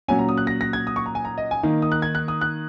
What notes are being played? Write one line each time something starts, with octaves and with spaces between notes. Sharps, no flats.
A#2 F#3 C#4 G#5
A#5
D#6
F#6
A#6
A#6
G#6
D#6
C#6
A#5
G#5
A#5
D#5
G#5
D#3 A#3 D#4
D#6
F#6
G#6
F#6
D#6
F#6